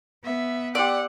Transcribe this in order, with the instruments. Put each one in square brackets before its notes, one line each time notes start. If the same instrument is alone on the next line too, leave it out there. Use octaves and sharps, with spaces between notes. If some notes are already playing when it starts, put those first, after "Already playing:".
[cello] B3 [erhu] E5
[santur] G4 C6 E6 [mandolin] D5 [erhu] F#5